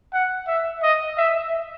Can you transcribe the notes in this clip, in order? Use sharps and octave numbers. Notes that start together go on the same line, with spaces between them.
F#5
E5
D#5
E5